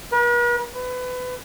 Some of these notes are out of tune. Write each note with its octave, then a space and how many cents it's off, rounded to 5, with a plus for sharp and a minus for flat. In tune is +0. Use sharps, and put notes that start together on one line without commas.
B4 -45
B4 +25